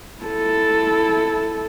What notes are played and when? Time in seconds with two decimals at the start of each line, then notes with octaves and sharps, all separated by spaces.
0.22 E4 A4